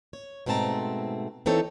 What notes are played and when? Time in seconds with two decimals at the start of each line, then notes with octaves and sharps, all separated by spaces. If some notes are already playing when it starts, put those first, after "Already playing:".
0.13 C#5
0.46 G#2 B2 A3 C4 A5 A#5
1.46 E3 C4 D#4 A4 C#5